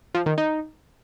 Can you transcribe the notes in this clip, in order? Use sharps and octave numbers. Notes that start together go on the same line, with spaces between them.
F3
D#3
D#4